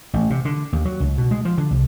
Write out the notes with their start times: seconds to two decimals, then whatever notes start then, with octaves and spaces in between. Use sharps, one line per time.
0.13 A1
0.30 C3
0.45 D3
0.73 D#2
0.85 F#3
1.00 C#2
1.18 B2
1.31 G#3
1.45 F3
1.58 D3
1.71 C2